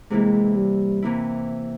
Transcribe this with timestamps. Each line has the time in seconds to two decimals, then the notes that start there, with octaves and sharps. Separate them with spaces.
0.10 C3 E3 G#3 A#3 E4
0.56 G3
1.02 C3 E3 A#3 E4